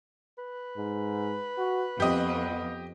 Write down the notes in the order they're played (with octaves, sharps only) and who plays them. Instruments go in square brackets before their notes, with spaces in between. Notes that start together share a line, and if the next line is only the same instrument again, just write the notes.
[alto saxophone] B4
[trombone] G#2
F#4
[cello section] F2 [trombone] B3 [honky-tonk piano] G4 D#5